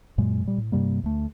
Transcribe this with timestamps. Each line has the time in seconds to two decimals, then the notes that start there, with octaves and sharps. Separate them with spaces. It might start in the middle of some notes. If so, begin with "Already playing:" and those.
0.18 F#2 A#2 F#3 G#3
0.44 A#2 G3
0.58 A2
0.72 G2 C3 G3 A#3
1.03 D2 A3